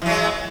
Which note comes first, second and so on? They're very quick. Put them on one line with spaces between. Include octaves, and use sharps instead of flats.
E3 F#3 G#3